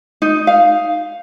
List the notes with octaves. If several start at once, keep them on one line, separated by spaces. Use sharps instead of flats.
D#4
F5